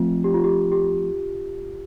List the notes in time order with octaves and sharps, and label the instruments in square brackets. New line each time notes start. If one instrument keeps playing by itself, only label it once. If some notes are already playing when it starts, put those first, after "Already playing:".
Already playing: [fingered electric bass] F3 A3 C4 [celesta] F4
[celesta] G4
F4
G4
G4